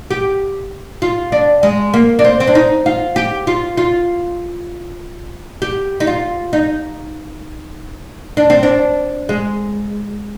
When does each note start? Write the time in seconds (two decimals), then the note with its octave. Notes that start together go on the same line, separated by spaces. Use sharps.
0.11 G4
1.02 F4
1.32 D4
1.63 G#3
1.94 A#3
2.19 D4
2.24 C4
2.40 C4
2.47 D4
2.55 D#4
2.86 F4
3.16 G4
3.47 F4
3.78 F4
5.62 G4
6.00 D#4
6.07 F4
6.53 D#4
8.37 D4
8.50 C4
8.63 D4
9.29 G#3